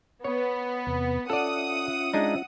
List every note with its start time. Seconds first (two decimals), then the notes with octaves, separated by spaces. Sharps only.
0.24 B3 C#5
0.87 E2 C3
1.30 C#4 F4 A4 D5 E5 F#5 D#6
2.14 G#3 D4 D#4